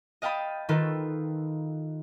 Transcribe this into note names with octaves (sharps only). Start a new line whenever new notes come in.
D#5 F5 G5 A5 B5 D#6
D#3 F4 A4 B4